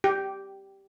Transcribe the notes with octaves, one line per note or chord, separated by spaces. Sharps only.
G4